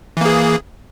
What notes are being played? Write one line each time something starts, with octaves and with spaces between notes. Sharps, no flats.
E3 A#3 G#4